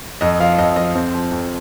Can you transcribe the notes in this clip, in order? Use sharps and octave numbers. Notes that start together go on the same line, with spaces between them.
F2 D#5
F3 F5
F2 D#5
F3 D#5
F2 C4
F3
F2